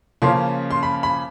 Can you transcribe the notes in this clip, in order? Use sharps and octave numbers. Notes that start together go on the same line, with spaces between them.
C#3 F3 A#3 C#4 C6
C6
B5
B5